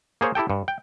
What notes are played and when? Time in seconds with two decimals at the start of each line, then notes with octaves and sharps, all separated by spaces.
0.21 A#3 G#4 C5 C#5
0.35 E4 G4 A4 G5
0.50 G2
0.68 G5